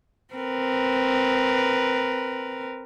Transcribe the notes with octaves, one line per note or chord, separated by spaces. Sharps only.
C4 A#4 B4